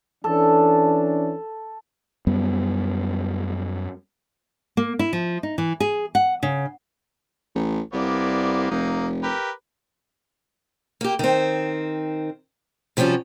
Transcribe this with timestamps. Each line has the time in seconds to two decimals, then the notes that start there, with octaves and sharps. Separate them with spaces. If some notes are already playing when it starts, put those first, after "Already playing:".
0.24 E3 C#4 D4 A4
2.27 F#2 G3 B3
4.77 A#3
4.99 E4
5.13 F3
5.43 D#4
5.58 E3
5.80 G#4
6.15 F#5
6.43 C#3
7.55 A1
7.93 C2 A#3 B3 D5
8.71 F1 A#3 D#4
9.23 G4 A#4 B4
11.01 A#3 G4
11.19 D#3 C4
12.97 C3 F3 G3 C#4 F#4